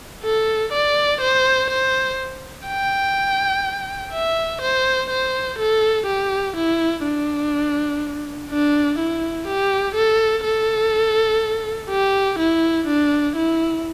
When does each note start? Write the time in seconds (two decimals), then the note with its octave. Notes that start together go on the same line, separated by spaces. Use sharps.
0.24 A4
0.73 D5
1.21 C5
1.70 C5
2.67 G5
4.13 E5
4.61 C5
5.10 C5
5.59 A4
6.07 G4
6.56 E4
7.04 D4
8.50 D4
8.99 E4
9.47 G4
9.96 A4
10.45 A4
11.90 G4
12.39 E4
12.87 D4
13.36 E4